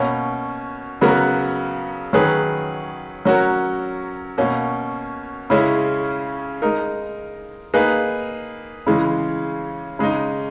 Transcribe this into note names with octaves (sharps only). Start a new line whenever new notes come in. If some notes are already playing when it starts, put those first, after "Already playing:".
Already playing: B2 A#3 C#4
C#3 F#3 B3 F#4 A#4
D#3 F#3 C#4 G#4 B4
F#3 C#4 F#4 A#4
B2 A#3 C#4
C#3 G#3 C#4 E4
G#3 D#4 A#4
A#3 D#4 G#4 B4
C#3 E3 G#3
C#3 G#3 D#4